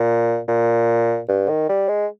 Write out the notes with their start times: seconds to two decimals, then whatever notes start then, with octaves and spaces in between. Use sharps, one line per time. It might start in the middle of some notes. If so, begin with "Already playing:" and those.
Already playing: A#2
0.48 A#2
1.29 G2
1.49 D#3
1.69 G3
1.89 G#3